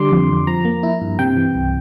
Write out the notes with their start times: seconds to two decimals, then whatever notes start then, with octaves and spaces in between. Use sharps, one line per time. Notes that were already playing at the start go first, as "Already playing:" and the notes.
Already playing: D3 G3 C6 D6
0.11 F2
0.29 F2
0.47 F3 A#5
0.65 A#3
0.83 E4
1.01 G2
1.19 C3 G5
1.37 E3
1.54 C2